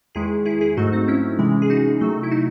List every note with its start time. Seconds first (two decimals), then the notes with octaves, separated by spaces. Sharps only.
0.15 E2 D#3 G#3 E4 G#4
0.45 E4 G#4
0.61 E4 G#4
0.77 G#2 F#3 A3 D#4 F#4
0.92 C4 D#4
1.08 C#4 E4
1.39 C3 E3 G#3
1.62 G#4
1.70 D#4 F#4
2.01 C3 F#3 A3
2.23 E4
2.31 D#4 F#4